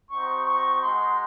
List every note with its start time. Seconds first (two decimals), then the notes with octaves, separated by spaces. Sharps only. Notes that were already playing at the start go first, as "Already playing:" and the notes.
0.10 C4 D#4 F#4 C#6
0.47 C#6
0.82 G#3 D#4 F#4 C6